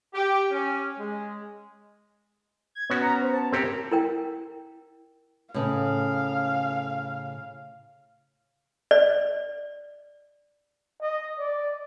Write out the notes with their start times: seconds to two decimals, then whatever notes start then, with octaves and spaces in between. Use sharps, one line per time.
0.14 G4
0.51 C#4
0.99 G#3
2.75 G#6
2.90 B3 C#4 F#4 C#5
3.02 A#5
3.22 C5
3.33 A5
3.52 C4 G4 A#4 C#5
3.91 E4 A#4 G5
5.54 A2 C#3 F5
8.91 D5
11.02 D#5
11.39 D5